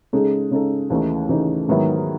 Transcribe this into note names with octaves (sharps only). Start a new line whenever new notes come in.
C#3 G#3 D#4 A4
C#3 G#3 D#4 A4
D#2 C#3 E3 A3 D#4
D#2 C#3 E3 A3 D#4
G#2 D#3 F#3 B3 E4